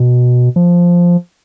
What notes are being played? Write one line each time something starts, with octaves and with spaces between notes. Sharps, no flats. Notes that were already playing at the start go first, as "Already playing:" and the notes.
Already playing: B2
F3